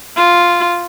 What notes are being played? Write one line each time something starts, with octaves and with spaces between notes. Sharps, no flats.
F4